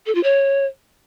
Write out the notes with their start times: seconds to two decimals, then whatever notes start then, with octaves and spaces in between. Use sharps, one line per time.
0.06 A4
0.15 F4
0.23 C#5